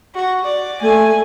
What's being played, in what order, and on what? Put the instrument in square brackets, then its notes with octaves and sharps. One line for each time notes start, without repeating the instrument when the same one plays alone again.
[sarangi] F#4
D5
[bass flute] A3 [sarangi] G#5